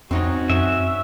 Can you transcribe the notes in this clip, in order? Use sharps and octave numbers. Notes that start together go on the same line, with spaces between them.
F2 C4 C#4 D#4 F#4 D#5
F#2 E5